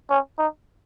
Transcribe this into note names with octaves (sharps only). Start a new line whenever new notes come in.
C#4
D#4